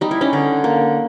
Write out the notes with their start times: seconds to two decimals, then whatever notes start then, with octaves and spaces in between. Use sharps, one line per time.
0.01 G3 D#4
0.11 E4
0.21 C#4 D#4
0.33 D3
0.64 A#3